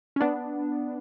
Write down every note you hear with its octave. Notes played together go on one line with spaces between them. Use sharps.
C#4
B3 D4